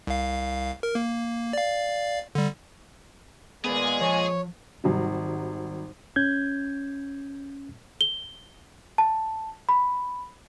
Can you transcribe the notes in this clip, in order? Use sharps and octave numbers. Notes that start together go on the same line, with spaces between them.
C2 F5
A#4
A#3
D5 F5
D3 G3
A#2 G#3 B3 G#4 B4 D5
F3 C#5
G#1 F#3 G3
C#4 G6 G#6
G7
A5
B5